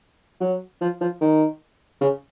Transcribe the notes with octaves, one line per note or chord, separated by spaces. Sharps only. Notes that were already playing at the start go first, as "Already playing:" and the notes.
F#3
F3
F3
D#3
C#3